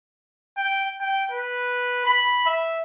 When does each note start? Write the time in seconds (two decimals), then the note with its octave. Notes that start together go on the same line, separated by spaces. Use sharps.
0.57 G5
1.01 G5
1.31 B4
2.06 B5
2.46 E5